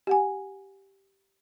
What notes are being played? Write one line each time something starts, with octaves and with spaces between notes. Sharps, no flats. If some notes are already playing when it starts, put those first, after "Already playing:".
G4 F#5 G#5